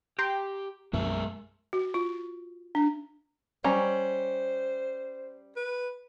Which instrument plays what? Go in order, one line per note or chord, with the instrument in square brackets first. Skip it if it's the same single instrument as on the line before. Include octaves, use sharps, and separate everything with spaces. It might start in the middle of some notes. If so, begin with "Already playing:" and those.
[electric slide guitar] G4 [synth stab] G5 A#5 C6
[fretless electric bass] B1 F#2 A#3 [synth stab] F3 [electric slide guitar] G#3 A#4 E5
[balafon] F#4
F4
D4
[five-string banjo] G3 C#4 A#5 [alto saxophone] C5
[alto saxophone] B4